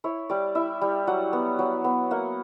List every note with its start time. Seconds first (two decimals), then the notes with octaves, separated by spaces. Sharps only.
0.04 E4 C#5
0.30 G3 D5
0.55 E4 E5
0.81 G3
1.07 F#3 F#5
1.33 B3
1.59 F#3
1.84 B3
2.11 A#3 F#5